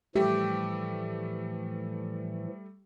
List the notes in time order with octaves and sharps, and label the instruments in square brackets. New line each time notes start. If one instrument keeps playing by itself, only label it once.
[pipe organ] A2 E3 F3 [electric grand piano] G3 A3 E5 [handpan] G4